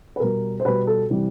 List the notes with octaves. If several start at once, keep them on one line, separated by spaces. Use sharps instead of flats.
B4
B2 G3 A#4
C5
B2 G3 B4
A4
C3 E3 G3